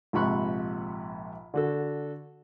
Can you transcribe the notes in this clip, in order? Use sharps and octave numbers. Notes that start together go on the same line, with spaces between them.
A#1 G#2 C3 B5 C#6 F#6
D3 F#4 A4